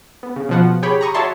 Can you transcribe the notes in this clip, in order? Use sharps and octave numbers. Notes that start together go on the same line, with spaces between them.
B3
C#3
B2 F3 F#5
G4 G#4 C#5 G5 B5
A#5 B5 C#6 D#6
F#4 C#5 D5 E5 A5 C6